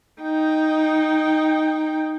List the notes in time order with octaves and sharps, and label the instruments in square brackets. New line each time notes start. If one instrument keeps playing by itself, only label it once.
[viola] D#4 G5